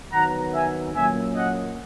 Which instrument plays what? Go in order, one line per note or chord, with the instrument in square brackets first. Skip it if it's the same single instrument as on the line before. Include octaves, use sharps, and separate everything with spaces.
[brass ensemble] D#3 F#3 B3 F#5 A#5
E5 G#5
A#2 F#3 A#3 C#4 E5 G#5
D#5 F#5